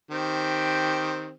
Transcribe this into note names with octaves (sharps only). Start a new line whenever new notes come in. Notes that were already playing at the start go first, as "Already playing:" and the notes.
D#3 C4 G4